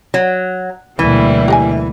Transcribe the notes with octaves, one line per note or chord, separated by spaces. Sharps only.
F#3
D2 B2 E3 G3 A#3 E4
G4 D#5 G#5